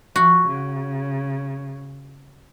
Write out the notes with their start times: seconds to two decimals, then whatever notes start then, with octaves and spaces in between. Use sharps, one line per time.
0.16 F3 F#4
0.48 C#3